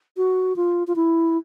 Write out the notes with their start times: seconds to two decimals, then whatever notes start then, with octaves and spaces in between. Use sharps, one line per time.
0.17 F#4
0.56 F4
0.87 F4
0.96 E4